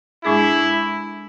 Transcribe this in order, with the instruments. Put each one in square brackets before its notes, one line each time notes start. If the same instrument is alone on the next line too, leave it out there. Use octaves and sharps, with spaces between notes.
[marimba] A2 G#3 D4 G#4 [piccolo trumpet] E4